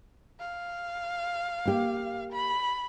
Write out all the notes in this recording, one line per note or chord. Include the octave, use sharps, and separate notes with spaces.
F5
A#3 G4
B5